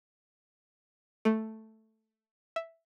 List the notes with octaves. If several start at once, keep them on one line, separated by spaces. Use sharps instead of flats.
A3
E5